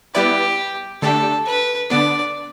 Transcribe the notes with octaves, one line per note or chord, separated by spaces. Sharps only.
G3 B3 E4 G4 B4 D5
D3 A3 D4 G4 A4
B4
D3 B3 D4 D5